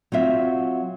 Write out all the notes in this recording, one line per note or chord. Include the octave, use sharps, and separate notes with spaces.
F#3 C4 F4 E5